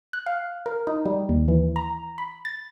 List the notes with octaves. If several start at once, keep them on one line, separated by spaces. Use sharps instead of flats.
F#6
F5
A#4
D#4
G3
D#2
E3
A#5
B5
A6